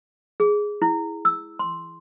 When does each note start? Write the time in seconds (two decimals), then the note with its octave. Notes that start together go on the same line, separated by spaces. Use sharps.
0.40 G#4
0.82 E4
1.25 E6
1.59 C6